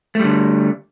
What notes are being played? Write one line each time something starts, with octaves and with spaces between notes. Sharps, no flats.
D3 G3 A3